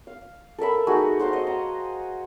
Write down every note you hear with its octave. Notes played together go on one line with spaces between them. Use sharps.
F5
A4 A#4 E5 B5
A3 D#4 F#4 G#4
F#4 C5 E5 F5
D#5
A#5